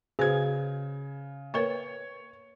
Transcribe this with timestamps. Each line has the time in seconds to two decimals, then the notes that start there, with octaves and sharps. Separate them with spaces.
0.19 C#3 F#4 G#4 B4 C5 G#6
1.54 A#3 A#4 B4 C#5 C#6